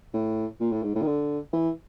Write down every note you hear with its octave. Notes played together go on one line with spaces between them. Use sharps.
A2
A#2
A2
G#2
A2
D#3
D3
E3